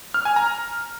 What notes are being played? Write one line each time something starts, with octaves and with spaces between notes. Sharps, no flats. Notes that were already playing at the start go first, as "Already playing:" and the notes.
F6
G#5
A#5